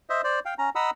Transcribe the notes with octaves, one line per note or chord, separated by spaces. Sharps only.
C5 D#5 E5
C5 D5
F5 G5
C#4 A#5
D#5 F#5 A#5 B5 D#6 E6